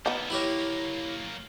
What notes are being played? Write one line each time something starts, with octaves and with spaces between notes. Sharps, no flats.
F3 B3 D#4 E4
F#3 A#3 E4 G4 C#5